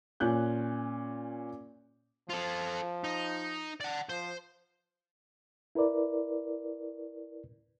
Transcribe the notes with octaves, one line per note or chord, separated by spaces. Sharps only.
A#2 C#4 F#6 G6
F3 F4 A4
D#4
D5 F#5
F3 C5
E4 A#4 B4 D5